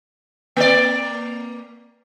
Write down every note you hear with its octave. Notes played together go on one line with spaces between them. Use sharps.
A#3 D5